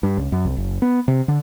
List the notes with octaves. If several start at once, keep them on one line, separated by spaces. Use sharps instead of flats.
G2
C#2
F#2
C2
F#1
B3
C3
D3